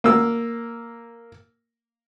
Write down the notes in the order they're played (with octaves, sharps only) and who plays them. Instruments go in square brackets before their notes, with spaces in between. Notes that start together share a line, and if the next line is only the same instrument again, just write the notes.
[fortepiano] A#3 E6